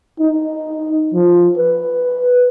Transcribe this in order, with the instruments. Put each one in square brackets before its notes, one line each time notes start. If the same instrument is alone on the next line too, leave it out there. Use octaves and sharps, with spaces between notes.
[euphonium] D#4
F3
B4